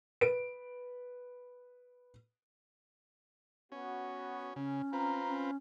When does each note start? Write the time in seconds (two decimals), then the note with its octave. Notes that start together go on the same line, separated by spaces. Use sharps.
0.21 B4 D7
3.72 B3 C#4 F#4
4.56 C#3 C#4
4.93 C4 F4 B4 A#5
5.27 C#4